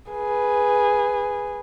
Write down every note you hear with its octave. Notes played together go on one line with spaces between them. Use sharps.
G#4 B4